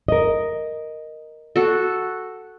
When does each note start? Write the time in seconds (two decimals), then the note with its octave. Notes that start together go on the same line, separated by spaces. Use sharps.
0.08 A#4 D#5
1.56 F#4 A4